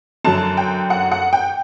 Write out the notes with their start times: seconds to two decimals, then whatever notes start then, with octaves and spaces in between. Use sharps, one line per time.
0.25 F#2 D3 F#3 A5
0.57 G5
0.90 F#5
1.11 F#5
1.33 G5